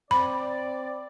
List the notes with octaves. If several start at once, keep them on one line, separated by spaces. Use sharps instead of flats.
C4 D5 B5